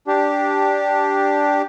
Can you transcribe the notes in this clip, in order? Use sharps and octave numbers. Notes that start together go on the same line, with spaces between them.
D4 G4